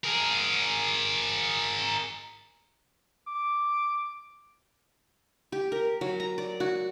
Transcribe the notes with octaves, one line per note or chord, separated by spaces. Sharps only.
G#4 A#4
D6
G4
A#4
F#3
A#5
D5
F#4